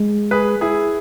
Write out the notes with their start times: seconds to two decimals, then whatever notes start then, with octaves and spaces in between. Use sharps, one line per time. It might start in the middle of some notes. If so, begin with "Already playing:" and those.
Already playing: G#3
0.31 G#4 B4
0.61 E4 G#4